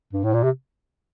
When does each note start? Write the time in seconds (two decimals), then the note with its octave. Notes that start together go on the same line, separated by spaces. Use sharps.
0.13 G2
0.24 A2
0.34 A#2
0.43 C3